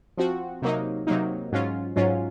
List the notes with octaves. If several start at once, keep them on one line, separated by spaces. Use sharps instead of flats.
F3 C4 F#4
C3 F#3 A#3 D#4
C3 F#3 A#3 D#4
G#2 F#3 C#4 F4
G#2 F#3 C#4 F4